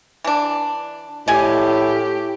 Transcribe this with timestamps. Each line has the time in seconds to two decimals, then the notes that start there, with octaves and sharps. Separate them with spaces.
0.24 E3 D4
1.28 A2 G4 D5 D#5 G#5